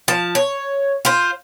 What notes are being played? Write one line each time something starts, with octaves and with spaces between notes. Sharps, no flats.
F3 A5
C#5
F4 C5